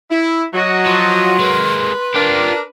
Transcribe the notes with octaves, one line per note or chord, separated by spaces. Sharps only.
E4
F#3 F#4 D#5
F3 C6
G#3 A#3 B4
D4 F4 G4 A#4